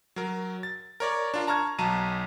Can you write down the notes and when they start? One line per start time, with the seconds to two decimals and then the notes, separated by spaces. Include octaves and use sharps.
0.16 F#3 A#4
0.63 A6
1.00 A#4 C#5 D5
1.34 D4 F4 A#4
1.47 A5 A#5 C#6 F6 G#6
1.79 B1 F#3 A5 A#5 D#7